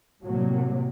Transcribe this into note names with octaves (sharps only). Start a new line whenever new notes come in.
A2 C3 F#3 G3 A#3